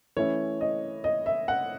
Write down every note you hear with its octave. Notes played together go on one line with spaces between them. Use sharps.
E3 A3 C#4 E4 C#5
D#5
D#5
E5
F#5